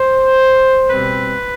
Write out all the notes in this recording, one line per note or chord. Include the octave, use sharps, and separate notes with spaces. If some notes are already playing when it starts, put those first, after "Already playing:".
Already playing: C5
B2 G3 C4 B4